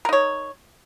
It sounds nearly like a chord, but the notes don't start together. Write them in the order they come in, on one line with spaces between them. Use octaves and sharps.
A#4 D#4 C#5